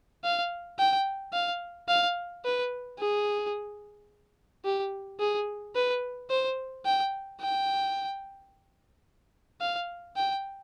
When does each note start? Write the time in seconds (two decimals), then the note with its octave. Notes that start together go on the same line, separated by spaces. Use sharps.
0.24 F5
0.79 G5
1.33 F5
1.88 F5
2.44 B4
2.99 G#4
4.65 G4
5.20 G#4
5.75 B4
6.30 C5
6.85 G5
7.41 G5
9.61 F5
10.16 G5